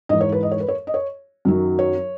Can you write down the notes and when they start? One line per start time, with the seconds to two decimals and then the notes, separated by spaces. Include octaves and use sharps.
0.09 G#2 E3 D#5
0.21 C#5
0.32 B4
0.43 D#5
0.51 C#5
0.60 B4
0.68 C#5
0.87 D#5
0.94 C#5
1.45 F#2 D#3 F#3
1.79 C#5